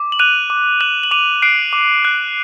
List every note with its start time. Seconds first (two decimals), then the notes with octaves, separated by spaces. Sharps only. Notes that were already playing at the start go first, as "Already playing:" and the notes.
Already playing: D6
0.12 F#7
0.19 F#6 D#7 F7
0.50 D6
0.80 F#6 E7 F#7
1.03 F#7
1.11 D6 D#7 F7
1.42 F#6 C7 D7
1.73 D6
2.05 F#6